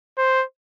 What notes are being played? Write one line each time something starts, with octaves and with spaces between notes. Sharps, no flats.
C5